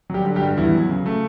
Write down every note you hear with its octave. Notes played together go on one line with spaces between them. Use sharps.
F#3 G3 G4
D3
G3 G4
G2
E2 E3 E4
F#3
C#3
A3